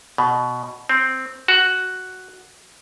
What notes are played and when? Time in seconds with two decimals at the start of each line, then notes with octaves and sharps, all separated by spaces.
0.18 B2
0.89 C4
1.48 F#4